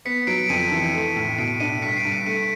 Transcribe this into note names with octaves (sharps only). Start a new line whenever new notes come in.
B3 B6 C#7
F#3 C7 D7
D7
F2 C#7 D#7
E3
A3
A2
B2 C7 D7
D4 C#7 D#7
G2 B6 C#7
C7 D7
G2
C#7 D#7
A3 C#7 D#7